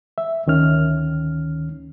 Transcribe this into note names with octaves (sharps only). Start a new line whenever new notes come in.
E5
D2 D#3 C#4 F6